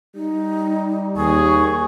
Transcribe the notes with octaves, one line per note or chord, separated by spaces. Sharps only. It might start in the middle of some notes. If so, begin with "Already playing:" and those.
G3 D#4
D#2 G#4 C#6